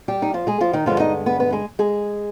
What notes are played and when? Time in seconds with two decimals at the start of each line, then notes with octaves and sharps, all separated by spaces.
0.08 G3 G4
0.22 D#4
0.34 F3 F4
0.47 G#3 G#4
0.61 F3 F4
0.73 D#3 D#4
0.86 G2 D3 F3 G#3 B3 F4
0.99 D#4 D#5
1.26 B3 B4
1.40 B3 B4
1.52 G#3 G#4
1.79 G#3 G#4